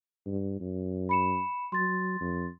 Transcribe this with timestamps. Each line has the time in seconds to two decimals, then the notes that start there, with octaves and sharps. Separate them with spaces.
0.26 G2
0.60 F#2
1.09 B5 C#7 E7
1.72 F#3 C6 A6
2.20 F2